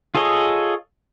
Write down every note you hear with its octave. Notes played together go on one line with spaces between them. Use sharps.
F4 G#4 A4 C#5 D#5